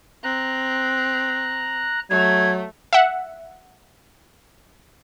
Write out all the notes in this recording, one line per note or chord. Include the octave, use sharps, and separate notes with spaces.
C4 A#5 F#6
F#3 A3 G#6
E5 F#5